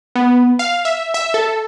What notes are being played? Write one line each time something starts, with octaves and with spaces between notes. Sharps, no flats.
B3
F5
E5
E5
A4